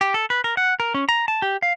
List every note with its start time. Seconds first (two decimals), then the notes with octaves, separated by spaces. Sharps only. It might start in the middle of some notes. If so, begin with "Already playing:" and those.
0.01 G4
0.14 A4
0.30 B4
0.44 A#4
0.57 F#5
0.80 A#4
0.94 C#4
1.09 A#5
1.28 A5
1.42 G4
1.62 F5